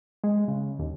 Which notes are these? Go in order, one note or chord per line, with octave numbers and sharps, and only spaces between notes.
G#3
C#3
D#2